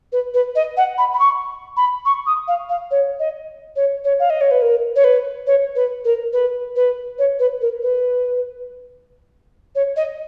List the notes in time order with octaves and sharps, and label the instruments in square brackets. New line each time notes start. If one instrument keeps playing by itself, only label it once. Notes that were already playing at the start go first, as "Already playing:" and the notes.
[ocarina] B4
B4
D#5
F#5
B5
B5
C#6
B5
C#6
D#6
F5
F5
C#5
D#5
C#5
C#5
F5
D#5
C#5
B4
A#4
C#5
B4
C#5
B4
A#4
B4
B4
C#5
B4
A#4
B4
C#5
D#5